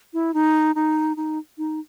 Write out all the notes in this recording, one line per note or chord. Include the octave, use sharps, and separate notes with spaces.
E4
D#4
D#4
D#4
D#4